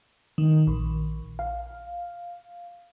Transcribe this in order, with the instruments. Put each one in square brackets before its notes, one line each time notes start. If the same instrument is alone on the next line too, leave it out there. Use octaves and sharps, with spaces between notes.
[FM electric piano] D#3
A#1
F5